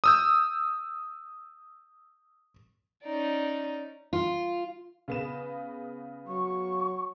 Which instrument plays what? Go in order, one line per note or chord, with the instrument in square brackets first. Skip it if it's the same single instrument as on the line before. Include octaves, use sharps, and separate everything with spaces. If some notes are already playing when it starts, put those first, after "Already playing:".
[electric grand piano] D#6 E6 G6
[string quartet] C#4 D#4 D5
[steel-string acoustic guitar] F4
[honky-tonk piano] C#3 B3 E7
[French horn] F#3 [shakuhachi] C#6